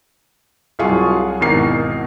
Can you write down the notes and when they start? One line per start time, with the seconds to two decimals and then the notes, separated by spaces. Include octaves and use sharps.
0.79 C2 F#3 F4 G#4 F5 C#6
1.41 G#1 E2 B2 A#4 C7